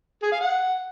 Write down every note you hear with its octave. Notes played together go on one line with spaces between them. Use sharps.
G#4
F5
F#5